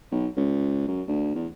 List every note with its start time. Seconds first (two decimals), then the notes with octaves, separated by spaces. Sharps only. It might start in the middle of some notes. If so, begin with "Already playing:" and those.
0.12 B1
0.37 C#2
0.88 F#2
1.08 D2
1.35 E2